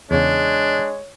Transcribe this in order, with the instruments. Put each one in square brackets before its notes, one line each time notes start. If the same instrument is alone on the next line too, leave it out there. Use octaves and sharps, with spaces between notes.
[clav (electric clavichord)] E2 C#3 [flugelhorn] G#3 [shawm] D4 [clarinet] C#5